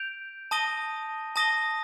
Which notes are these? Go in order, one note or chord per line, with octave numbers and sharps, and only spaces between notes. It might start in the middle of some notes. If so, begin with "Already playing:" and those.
Already playing: G6 D7 F7
A5 D#6 A#6 D#7 G7
A5 D#6 A#6 D#7 G7